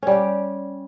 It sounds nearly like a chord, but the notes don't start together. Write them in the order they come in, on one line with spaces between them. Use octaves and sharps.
C#4 G3 G4